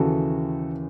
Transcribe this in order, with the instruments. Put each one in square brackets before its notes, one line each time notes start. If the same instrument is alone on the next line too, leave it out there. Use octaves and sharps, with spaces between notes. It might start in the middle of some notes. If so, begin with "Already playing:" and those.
Already playing: [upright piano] D#2 C#3 E3 F#4 A4